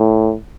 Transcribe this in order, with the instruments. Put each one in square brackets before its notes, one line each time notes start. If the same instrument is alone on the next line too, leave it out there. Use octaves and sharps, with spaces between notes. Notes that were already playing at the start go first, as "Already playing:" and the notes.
Already playing: [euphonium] A2